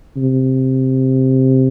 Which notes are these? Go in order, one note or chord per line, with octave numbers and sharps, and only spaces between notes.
C3